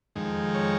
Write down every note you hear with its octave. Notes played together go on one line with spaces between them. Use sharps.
F2 D#3 G#3
C#5